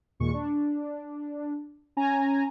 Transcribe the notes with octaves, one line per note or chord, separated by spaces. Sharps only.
D#2 A#2 G#3 C#6
D4
C#4 G#5 A#5